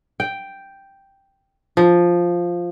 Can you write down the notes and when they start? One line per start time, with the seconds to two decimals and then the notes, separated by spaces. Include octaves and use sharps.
0.20 G5
1.77 F3